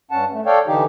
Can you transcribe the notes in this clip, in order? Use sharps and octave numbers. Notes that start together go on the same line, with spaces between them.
G2 C#4 F#5 A5
A3
A4 C#5 D5 F5 G5
D3 E3 D#4 G4